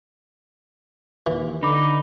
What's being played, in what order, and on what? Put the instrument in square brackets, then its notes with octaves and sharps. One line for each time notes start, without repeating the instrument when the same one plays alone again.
[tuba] D#2 [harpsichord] E3
[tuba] D3 [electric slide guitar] D#4 [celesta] B5 D6